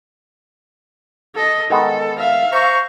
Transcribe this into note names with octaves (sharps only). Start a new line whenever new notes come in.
A4 D#5
D#3 G#3 B3 A4
E5 F5
C5 A#5 C#6